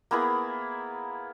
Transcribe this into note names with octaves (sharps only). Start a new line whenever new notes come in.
A#3 B3 E4 G#4